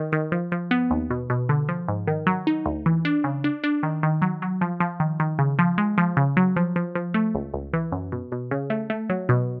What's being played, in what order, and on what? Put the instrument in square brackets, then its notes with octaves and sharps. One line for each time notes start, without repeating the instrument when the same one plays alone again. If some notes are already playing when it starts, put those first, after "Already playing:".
Already playing: [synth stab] D#3
D#3
F3
F3
B3
D#2
B2
B2
D3
F3
G#2
D#3
F#3
D#4
D2
E3
D4
C#3
D4
D4
D#3
D#3
F#3
F#3
F3
F3
D#3
D#3
C#3
F3
G#3
F3
C#3
F#3
F3
F3
F3
A3
C#2
C#2
E3
F#2
B2
B2
C#3
A3
A3
F#3
B2